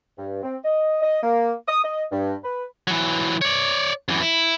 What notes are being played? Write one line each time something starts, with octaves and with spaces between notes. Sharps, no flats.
G2
C4
D#5
D#5
A#3
D#6
D#5
G2
B4
E3 F#3
C#5 D5
F#2 E3
E4